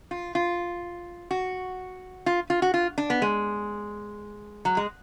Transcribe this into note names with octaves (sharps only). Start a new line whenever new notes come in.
F4
F4
F#4
F4
F4
F#4
F4
D4
B3
G#3
F#3
G#3